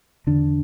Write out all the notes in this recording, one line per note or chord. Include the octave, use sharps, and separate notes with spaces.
E2 D3 D4